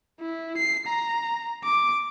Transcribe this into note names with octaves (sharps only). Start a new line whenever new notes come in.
E4
C7
A#5
D6